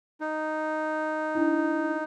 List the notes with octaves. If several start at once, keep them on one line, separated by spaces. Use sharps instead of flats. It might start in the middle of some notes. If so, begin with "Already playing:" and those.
D#4
D4 E4